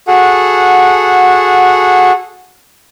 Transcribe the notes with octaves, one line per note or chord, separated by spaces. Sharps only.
F#4 G#4 A4 F#5